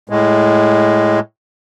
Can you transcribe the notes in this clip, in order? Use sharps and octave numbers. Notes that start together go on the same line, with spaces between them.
A2 G#3